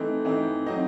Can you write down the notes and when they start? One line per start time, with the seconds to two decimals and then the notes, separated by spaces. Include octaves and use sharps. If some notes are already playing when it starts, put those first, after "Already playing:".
Already playing: E3 A3 C4 D#4
0.25 E3 A3 C4 D#4
0.66 F#3 C4 D#4 D#5